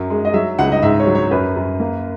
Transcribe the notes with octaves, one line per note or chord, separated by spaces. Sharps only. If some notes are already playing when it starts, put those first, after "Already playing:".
Already playing: F#2 F#3
G#3
D#5
F#3 E5
C#2 F#5
D#5
G#2 E5
C#5
F#3
C#5
F#2 B4
F#2
A#3